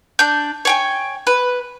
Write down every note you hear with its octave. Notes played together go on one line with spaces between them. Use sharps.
D4 G6
C#5 G5 G#5
B4